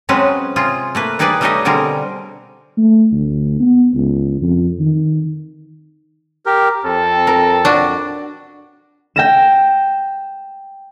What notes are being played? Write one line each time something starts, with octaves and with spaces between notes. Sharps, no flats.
F#3 G#3 C4 C#4 B4
C3 F4 G#4
A3 A#3 B4
G3 D#4 G#4 B4 D5
G3 A3 D#4 G4 C#5 D#5
B2 D3 G3 C4 G#4 A#4
A3
D2
B3
C#2
F2
D#3
G4 A#4
F2 C4 A4
A#4
D4 F#4
G5 A#6 E7